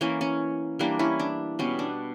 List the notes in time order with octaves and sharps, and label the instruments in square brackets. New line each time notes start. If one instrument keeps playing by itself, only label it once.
[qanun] E3 A#3 C#4
C#4
E3 G3 A#3 D4
C#4 E4
D4
B2 G3 B3 C#4
D4